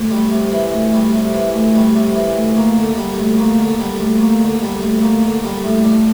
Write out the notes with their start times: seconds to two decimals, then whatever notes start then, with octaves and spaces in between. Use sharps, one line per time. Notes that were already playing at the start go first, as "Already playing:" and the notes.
Already playing: D2
0.11 G3
0.31 C3
0.52 E3
0.72 D2
0.93 G3
1.14 C3
1.34 E3
1.54 D2
1.75 G3
1.95 C3
2.15 E3
2.36 D2
2.57 A#3
2.77 D3
2.97 G3
3.18 D2
3.39 A#3
3.59 D3
3.79 G3
4.00 D2
4.21 A#3
4.41 D3
4.62 G3
4.82 D2
5.02 A#3
5.23 D3
5.44 G3
5.64 A2
5.84 D4